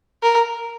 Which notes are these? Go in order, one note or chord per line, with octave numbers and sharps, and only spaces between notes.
A#4